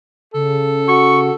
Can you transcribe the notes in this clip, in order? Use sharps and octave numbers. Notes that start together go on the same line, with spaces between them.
C#3 A4
F#4 C#6